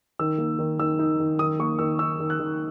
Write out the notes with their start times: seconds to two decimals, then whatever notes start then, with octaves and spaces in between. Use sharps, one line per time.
0.19 D#3 E6
0.38 A#3
0.59 D#3
0.79 D#3 E6
0.99 D#4
1.20 D#3
1.39 D#3 D#6
1.59 A#3 C#6
1.79 D#3 E6
1.99 D#4 E6
2.20 D#3
2.30 F#6
2.39 D#3